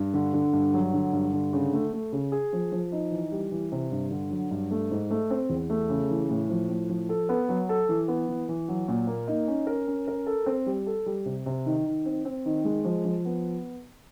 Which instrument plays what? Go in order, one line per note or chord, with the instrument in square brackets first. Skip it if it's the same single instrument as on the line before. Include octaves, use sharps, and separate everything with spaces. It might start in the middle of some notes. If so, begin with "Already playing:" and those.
Already playing: [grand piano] G2
D3
D3
G2
F#3
D3
G2
D3
C#3
A3
A3
C#3
G#4
F3
F3
D#4
E3
G3
E3
C3
G2
D3
F#3
G2
A3
G#2
A3
C4
E2
A3
C#3
E3
A2
F3
A2
F3
A4
B3
F#3
A4
E3
B3
E3
E3
F#3
A#2
A#3
D#4
C#4
A#4
C#4
A#4
A4
C4
G3
A4
G3
C3
C3
D#3
D#3
C4
C4
D#3
G#3
F3
F3
B3